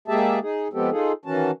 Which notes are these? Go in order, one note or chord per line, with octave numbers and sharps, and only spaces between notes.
G#3 A#3 G4 G#4 E5 A5
D#4 G#4
F3 G#3 B3 C4 G4 A4
D#4 F4 G#4 A4
D#3 E3 C#4 F#4 A5